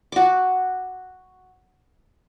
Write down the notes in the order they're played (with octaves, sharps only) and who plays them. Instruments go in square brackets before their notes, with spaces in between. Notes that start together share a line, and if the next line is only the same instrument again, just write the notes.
[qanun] F#4 D6